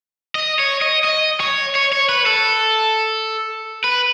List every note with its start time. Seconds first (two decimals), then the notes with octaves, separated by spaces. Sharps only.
0.35 D#5
0.59 C#5
0.81 D#5
1.04 D#5
1.40 C#5
1.75 C#5
1.93 C#5
2.09 B4
2.26 A4
3.84 B4